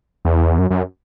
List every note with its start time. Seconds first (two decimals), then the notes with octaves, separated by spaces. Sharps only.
0.25 E2
0.59 F#2
0.70 F#2